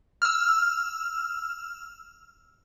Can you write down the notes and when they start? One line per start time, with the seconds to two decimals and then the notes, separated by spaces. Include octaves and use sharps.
0.22 E6 F6